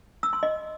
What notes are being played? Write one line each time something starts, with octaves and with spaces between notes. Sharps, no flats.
E6
C6
D#5